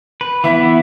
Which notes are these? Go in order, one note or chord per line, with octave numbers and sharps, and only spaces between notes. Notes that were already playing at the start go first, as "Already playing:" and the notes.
B4
E3 B3 E4 E5